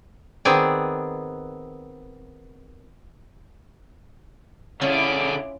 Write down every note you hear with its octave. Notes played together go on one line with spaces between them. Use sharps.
D#3 B3 C4 G#4 D5
D3 C#4 E4 F4 G#4 C#5 D6